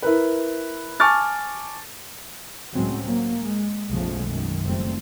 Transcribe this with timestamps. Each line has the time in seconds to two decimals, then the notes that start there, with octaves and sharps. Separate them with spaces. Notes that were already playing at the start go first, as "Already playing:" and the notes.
0.02 E4 A#4 B4
1.00 G#5 A5 C#6 D6 F6 A6
2.72 C#2 A2 F#3 G#3 C4 C#4
3.05 F#3 A#3
3.40 G#3
3.91 F#1 B1 C#3 F3 G#3 A3
4.24 G#1 F#2 D#3
4.64 F#1 F2 G3 A3 C4